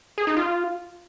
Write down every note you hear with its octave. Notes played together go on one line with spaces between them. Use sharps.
G#4
D#4
F4